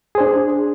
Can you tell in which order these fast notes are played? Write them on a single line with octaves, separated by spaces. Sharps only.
G#4 C5 D4